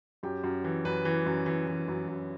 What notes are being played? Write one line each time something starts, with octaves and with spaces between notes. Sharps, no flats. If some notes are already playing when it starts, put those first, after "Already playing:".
F#2 G4
F#2
E3
F#2 B4
E3
F#2
E3
E3
F#2
F#2